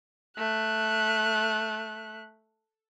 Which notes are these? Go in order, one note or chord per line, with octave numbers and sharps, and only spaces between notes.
A3 F#6